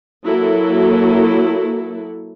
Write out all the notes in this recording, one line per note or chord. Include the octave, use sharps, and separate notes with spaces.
F#3 A#3 E4 A4